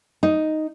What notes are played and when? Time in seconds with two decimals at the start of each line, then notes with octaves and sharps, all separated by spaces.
0.23 D#4